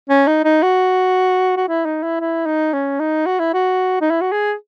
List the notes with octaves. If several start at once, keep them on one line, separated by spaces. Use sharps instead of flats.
C#4
D#4
D#4
F#4
F#4
E4
D#4
E4
E4
D#4
C#4
D#4
F#4
E4
F#4
D#4
E4
F#4
G#4